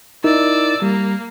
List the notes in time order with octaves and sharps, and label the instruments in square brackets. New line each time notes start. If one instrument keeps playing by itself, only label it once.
[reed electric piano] D#4 E4 A#4 [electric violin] D5 E6
[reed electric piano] G3 [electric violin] A#3